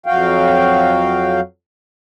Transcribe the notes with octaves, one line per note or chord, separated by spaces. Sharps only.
F2 F#3 F#4 F5 G5